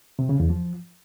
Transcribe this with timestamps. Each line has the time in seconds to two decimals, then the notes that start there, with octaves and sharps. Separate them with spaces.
0.19 C3
0.29 C#3
0.40 E2
0.50 F3